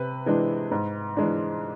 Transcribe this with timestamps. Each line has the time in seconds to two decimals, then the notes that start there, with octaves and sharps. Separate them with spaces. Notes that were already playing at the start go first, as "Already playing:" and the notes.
Already playing: C3 B4
0.26 E3 G#3 D4
0.71 G#2
1.17 E3 G#3 D4